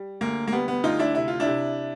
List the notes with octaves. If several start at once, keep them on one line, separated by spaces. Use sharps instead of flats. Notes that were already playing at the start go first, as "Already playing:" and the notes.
Already playing: G3
D2 A#3
A#3
G3 B3
B3
D2 D#4 F4
D4 E4
C3 E4
F4
D4 E4
C3